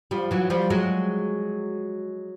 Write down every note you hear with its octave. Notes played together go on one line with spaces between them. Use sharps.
F3 G3
E3 F#3
F3 G3
F#3 G#3